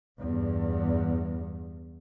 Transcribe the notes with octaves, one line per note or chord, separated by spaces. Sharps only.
E2 G2